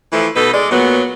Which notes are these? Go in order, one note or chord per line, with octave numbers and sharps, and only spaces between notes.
E3 F3 A3
B2 D#4 A4 B4
G#3 D5
A#2 F#3 B3